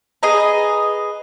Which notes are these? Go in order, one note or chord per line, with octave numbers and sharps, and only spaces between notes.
G#4 B4 D#5 A#5